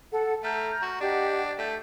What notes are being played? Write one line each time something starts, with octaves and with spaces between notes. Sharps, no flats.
A4 F#5
A3 A#5 F6 G6
F#4
D4 G4 D#5 F#5
A3 G6